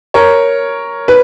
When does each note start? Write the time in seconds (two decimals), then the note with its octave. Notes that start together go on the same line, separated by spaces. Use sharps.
0.14 A#4 C#5
1.08 B4